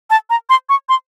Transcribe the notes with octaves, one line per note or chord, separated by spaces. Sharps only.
A5
A#5
C6
C#6
C6